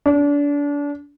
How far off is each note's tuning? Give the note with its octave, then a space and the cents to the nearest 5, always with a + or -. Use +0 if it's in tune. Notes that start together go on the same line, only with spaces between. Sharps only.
D4 -30